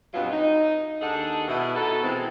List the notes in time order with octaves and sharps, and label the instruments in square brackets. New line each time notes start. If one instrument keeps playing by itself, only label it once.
[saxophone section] G2 B2 F#3 B3 C4 F4
D#4
D#2 D4 D#4 G#4 A4 F#5
B2 E4
B3 D#4 F#4 A4
B2 E3 G#3 C4